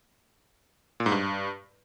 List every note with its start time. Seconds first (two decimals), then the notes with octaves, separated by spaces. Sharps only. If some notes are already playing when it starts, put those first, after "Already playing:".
1.00 A#2
1.06 G#2
1.12 G2